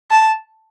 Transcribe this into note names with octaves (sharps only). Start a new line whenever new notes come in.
A5